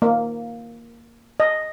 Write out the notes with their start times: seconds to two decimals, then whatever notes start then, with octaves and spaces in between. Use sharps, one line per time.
0.02 A#3
1.40 D#5